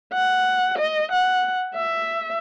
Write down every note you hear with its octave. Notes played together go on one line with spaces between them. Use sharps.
F#5
D#5
F#5
E5